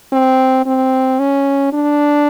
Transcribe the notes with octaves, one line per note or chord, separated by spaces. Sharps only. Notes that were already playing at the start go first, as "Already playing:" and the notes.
C4
C4
C#4
D4